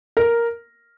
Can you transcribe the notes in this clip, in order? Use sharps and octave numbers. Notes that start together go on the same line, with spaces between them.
A#4